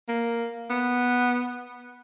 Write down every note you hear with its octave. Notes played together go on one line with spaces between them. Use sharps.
A#3
B3